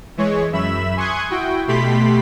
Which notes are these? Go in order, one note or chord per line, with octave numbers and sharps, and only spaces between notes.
E3 G#3 C#5
F#2 E5 B5 E7
G#5 C6 C#6 D#6 F#6 G#6
E4 F#4 G5
B2 A3 G4 B5 C6 B6